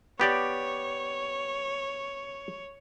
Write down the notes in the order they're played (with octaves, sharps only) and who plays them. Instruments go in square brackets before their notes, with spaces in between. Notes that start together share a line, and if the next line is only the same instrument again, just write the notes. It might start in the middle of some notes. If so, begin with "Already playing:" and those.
[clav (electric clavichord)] B3 G4 D5 [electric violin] C#5